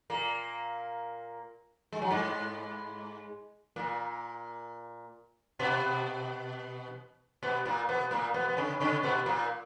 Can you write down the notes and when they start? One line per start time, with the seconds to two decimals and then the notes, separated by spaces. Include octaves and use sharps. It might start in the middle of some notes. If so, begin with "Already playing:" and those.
0.10 A#2 A#3
1.92 G#3
2.02 F#3
2.11 G#2 G#3
3.76 A#2 A#3
5.59 B2 B3
7.43 B2 B3
7.65 A#2 A#3
7.89 B2 B3
8.11 A#2 A#3
8.34 B2 B3
8.49 B3
8.57 C#3 C#4
8.80 C#3 C#4
9.03 B2 B3
9.26 A#2 A#3